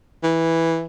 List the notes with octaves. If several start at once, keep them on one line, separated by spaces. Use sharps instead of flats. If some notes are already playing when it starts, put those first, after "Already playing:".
E3